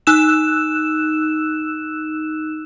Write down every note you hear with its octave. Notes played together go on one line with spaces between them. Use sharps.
D#4 E6 F#6 E7